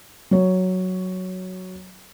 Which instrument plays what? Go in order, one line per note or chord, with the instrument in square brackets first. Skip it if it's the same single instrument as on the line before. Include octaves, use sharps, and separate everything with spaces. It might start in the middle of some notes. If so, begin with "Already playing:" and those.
[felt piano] F#3 C#5